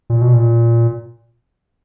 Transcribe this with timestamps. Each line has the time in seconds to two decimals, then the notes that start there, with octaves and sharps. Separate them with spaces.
0.10 A#2
0.21 B2
0.33 A#2